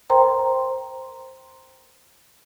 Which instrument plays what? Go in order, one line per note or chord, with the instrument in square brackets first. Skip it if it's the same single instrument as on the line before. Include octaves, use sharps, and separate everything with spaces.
[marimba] A#4 C5 G5 A#5 C6